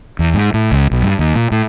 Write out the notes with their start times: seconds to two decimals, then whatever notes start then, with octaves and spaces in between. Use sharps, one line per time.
0.19 E2
0.34 G#2
0.54 A2
0.72 C#2
0.91 B1
1.03 G2
1.19 D#2
1.35 A#2
1.52 A2